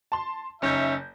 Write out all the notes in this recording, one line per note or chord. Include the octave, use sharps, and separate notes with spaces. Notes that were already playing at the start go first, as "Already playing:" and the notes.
A5 C6
F#1 C#4 D#4 E5 G6